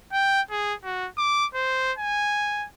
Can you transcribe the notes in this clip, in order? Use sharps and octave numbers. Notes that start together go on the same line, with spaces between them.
G5
G#4
F#4
D6
C5
G#5